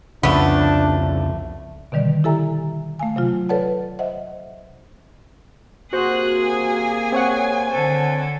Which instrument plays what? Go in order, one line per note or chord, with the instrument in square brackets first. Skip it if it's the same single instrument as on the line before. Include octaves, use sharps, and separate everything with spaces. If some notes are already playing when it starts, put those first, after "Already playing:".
[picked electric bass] C2 F2 C#3 [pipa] A3 B3 [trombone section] D4
[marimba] B2 D3 D#3 G3 D5
E4 G4 A4 E5 G#5 A#5
A3 F5 G#5
C3 F#3 F4
A4 B4 C#5 D5 F#5 A5
C5 D#5 E5 F#5
[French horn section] C3 A#3 [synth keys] F#4 C5 [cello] G#4 [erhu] F#6
[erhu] G#5
[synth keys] C4 C#5 F#5
[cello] D3 A4 [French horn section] C5